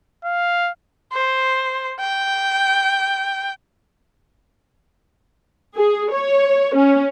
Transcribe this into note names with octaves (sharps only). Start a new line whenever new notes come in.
F5
C5
G5
G#4
C#5
C#4